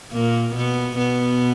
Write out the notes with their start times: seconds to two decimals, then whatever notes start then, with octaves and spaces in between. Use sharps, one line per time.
0.12 A#2 A#3
0.55 B2 B3
0.98 B2 B3